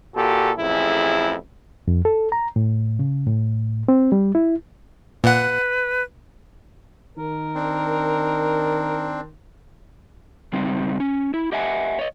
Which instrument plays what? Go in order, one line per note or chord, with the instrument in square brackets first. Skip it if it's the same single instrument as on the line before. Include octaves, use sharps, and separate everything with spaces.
[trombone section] A#2 F#4 G4 A4
A1 F2 E4 G#4
[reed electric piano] F2
A4
A#5
A2
C#3
A2
C4
G3
E4
[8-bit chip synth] A#2 F#5 [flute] B4
[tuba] D#3 [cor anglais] A#4
[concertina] C4 D4
[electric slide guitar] C#3 G3 C4 D#4
C#4
E4
G4 D#5 E5 F#5 G#5
C#5 D#5